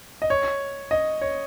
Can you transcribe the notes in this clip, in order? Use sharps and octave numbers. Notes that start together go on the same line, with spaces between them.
D#5
C#5
D#5
C#5